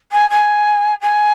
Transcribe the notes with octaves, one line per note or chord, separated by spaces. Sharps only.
G#5
G#5
G#5